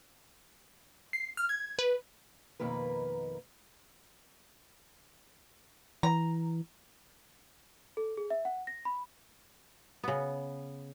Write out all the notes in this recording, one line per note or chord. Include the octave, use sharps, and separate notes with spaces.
C7
F6
G#6
B4
F2 B2 D#3 A#3 B4
E3 A#5
A4
G#4
E5
F#5
A#6
B5
C#3 B3